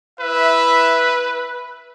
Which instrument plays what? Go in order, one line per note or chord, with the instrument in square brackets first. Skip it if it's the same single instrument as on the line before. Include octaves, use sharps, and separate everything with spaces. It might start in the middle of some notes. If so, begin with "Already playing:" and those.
[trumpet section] E4 E5 [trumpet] B4